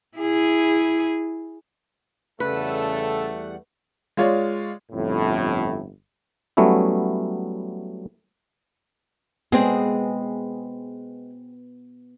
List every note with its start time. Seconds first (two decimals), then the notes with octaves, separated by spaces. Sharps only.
0.18 E4 G#4
2.40 E2 C#3 G3 A3 A4 B4 F#5
4.17 G#3 F4 C#5 D5
4.91 G1 F2 A2
6.57 F#3 G3 A3 B3 C#4 E4
9.52 G#3 B3 C4 G#4